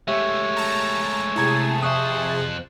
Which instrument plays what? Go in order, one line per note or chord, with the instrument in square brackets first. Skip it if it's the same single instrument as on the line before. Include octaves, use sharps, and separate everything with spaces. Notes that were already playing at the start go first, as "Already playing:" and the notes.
[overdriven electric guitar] G#3 A3 [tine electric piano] G4 E5 [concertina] C#5
[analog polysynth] A5 A#5
[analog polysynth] C3 G#4 A5 [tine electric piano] E4 A#5 G#6
[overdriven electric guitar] F2 C5 [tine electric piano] E5 C#6 D#6 [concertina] F#6